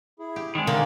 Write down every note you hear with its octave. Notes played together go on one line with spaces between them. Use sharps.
E4 G#4
G4
C3 D#3 G3 G#3
D3 A#3